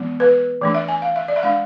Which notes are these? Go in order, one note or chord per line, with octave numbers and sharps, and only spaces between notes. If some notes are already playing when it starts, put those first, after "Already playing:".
Already playing: E3 G#3 B3
B4
E3 A3 D4
E5
G#5
F5
E5
D5
E5
G#3 D4 F5